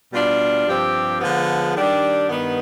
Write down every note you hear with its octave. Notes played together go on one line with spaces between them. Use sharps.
B2 G3 D4 F4
G2 F3 C4 G4
D3 F3 G#3 B3
D#3 G3 D4 G4
G2 D#3 B3